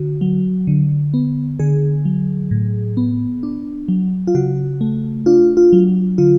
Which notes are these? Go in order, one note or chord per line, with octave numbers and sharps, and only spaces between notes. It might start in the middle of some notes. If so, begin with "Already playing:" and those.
Already playing: D3 F#4
F#3
D3
B3
D3 G#4
F#3
A2
B3
D4
F#3
F4
C#3 F#4
A3
D4 F4
F4
F#3
D3 F4